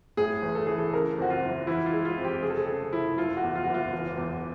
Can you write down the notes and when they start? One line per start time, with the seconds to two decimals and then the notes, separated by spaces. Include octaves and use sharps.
0.17 A2 G#4
0.42 A1
0.55 A4
0.67 E3 G#4
0.78 A4
0.93 C#3 A#4
1.18 F2 F#4
1.30 F4
1.42 F#1
1.67 E3 E4
1.86 F4
1.93 G#3
2.05 F4
2.17 F2
2.25 G4
2.42 F1 G#4
2.50 A4
2.57 G#4
2.67 C#3 A4
2.92 F1 E4
3.17 F#1 F4
3.37 F#4
3.43 E2
3.55 F4
3.64 F#1 F#4
3.74 F4
3.93 E1
4.17 E2